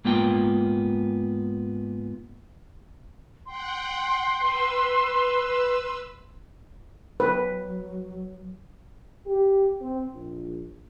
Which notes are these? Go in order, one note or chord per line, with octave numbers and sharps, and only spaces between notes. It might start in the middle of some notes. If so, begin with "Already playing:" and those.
G#2 A#3 B3 F4 G5
F#5 G5 C6
B4 E6
F#3 B4
G4
C4
A#1